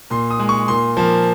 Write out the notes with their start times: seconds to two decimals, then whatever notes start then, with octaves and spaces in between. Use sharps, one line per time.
0.10 A#2 C6
0.31 D#6
0.39 G#3
0.49 C#6
0.68 A#2 C6
0.97 F3 A#3